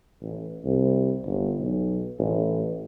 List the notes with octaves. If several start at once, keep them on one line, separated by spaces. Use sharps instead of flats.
A1
C2
G1
B1
A1